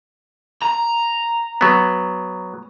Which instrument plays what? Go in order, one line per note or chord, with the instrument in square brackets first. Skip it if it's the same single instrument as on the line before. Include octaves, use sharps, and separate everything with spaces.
[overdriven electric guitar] A#5
[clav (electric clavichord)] F#3 B3